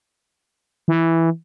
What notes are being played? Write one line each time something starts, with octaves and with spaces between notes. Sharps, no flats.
E3